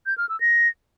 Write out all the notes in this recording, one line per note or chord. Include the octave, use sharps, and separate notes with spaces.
G6
F6
E6
A#6